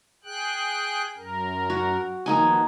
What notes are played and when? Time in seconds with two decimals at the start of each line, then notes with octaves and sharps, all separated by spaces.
0.24 G#4 G5 F#6
1.17 F#2 A#4
1.70 F#4
2.26 D#3 F3 A#3 B3 D#4 G#5